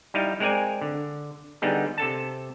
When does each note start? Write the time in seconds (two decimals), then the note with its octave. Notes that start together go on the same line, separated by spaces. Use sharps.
0.14 G3 D#4 E4 D#5 F5
0.40 G#3 C4 A#4 D5 G#5
0.82 D3
1.62 D3 G3 B3 D#4 G#4
1.98 C3 A4 A5